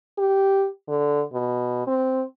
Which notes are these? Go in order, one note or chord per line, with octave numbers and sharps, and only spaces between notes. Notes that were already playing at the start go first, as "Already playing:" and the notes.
G4
D3
B2
C4